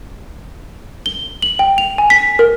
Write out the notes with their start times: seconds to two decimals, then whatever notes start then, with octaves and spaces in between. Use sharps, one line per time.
1.06 G7
1.42 F#7
1.59 G5
1.78 F7
1.98 G#5
2.10 B6
2.39 A#4